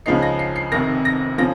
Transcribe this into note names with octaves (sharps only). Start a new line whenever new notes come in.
C#2 C#3 F3 G#3 D#4 C7
A#6
C7
C7
F1 F2 C3 D#3 A#6
A#6
C#3 F3 A#6